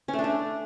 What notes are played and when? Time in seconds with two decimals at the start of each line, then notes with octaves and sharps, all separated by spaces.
0.08 C#4
0.13 A3
0.19 D4
0.24 A3